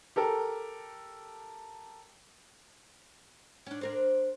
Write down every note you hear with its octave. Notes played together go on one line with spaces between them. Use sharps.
G4 A4 A#4
C#4 D4
D4 A#4 C5